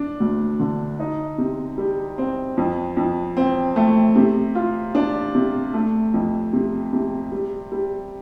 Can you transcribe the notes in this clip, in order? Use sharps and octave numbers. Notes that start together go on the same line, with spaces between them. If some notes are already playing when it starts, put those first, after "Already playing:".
Already playing: D4
D2
D3
D#4
C3
G3
C4
F2
F2
C4
A3
C3
F4
D4
C3
A3
F2
C3
C3
G3
G3